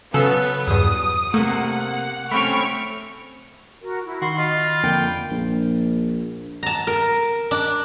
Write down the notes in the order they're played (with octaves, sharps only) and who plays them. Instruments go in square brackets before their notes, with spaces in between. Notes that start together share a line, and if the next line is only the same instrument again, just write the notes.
[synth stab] C#3 A4 E6 [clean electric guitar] F#3 [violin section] B3
[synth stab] E2 G2 [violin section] D#6
[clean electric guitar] C3 A#3 [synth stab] A3 [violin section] F#5
[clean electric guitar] A3 C4 C#4 [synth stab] B5 [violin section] C#6 F6 D7
[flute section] F#4 A#4
E4
[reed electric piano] D#3 [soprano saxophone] F#4 [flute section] B5 [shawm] C6
[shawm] F4 [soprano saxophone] D#5
[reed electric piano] F2 D3 A#3 [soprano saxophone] G5
[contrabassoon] A#1
[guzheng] A5 A#5
A#4
D4